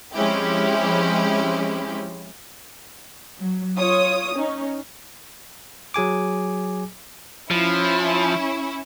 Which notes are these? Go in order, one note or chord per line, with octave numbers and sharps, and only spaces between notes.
F3 G#3 C4 C#4 E4 G4
F#3
F4 C#5 D#6
C#4 D#4
F#3 G#4 G#5 D6
F3 C#4 E4